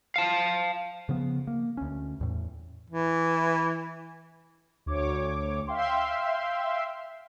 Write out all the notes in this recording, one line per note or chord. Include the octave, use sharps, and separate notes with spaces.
F5 A5
C#3 F3 B3
A#3
D2 C#4
E2 A2
E3
D2 C#5 D6
E5 F5 G5 C6